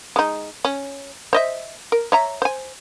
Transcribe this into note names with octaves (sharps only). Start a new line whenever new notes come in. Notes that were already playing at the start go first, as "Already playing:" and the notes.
G#3 D#4
C#4
C5 D#5 E5
A#4
C#5 E5 A#5
C5 G#5